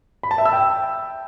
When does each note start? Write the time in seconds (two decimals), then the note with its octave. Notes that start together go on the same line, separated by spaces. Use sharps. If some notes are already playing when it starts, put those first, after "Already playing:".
0.23 B5
0.31 A5
0.38 E5
0.45 E6
0.53 G5